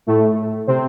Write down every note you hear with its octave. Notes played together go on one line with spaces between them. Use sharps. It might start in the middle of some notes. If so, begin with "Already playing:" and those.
A2 A3
C3 C4